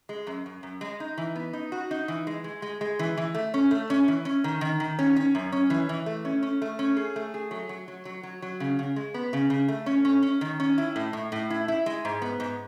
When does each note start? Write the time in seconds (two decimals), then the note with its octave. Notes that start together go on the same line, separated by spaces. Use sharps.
0.09 G#3
0.27 F#2
0.46 F#2
0.63 F#2
0.81 G#3
1.00 D#4
1.18 E3
1.36 B3
1.53 D#4
1.72 F#4
1.91 D#4
2.08 E3
2.27 G#3
2.44 G#3
2.62 G#3
2.81 G#3
2.99 E3
3.17 E3
3.34 A3
3.54 C#4
3.71 A3
3.90 C#4
4.08 E3
4.25 C#4
4.44 D#3
4.61 D#3
4.80 D#3
4.99 C#4
5.16 C#4
5.35 F#2
5.52 C#4
5.70 E3
5.89 E3
6.06 A3
6.25 C#4
6.43 C#4
6.62 A3
6.79 C#4
6.97 G#4
7.16 A3
7.34 G#4
7.51 F#3
7.69 F#3
7.88 F#3
8.05 F#3
8.23 F#3
8.42 F#3
8.60 C#3
8.79 C#3
8.96 G#3
9.14 B3
9.33 C#3
9.50 C#3
9.68 A3
9.86 C#4
10.05 C#4
10.23 C#4
10.41 D#3
10.60 C#4
10.78 E4
10.96 A2
11.13 A2
11.32 A2
11.50 E4
11.68 E4
11.86 G#3
12.05 G#2
12.22 B3
12.40 G#2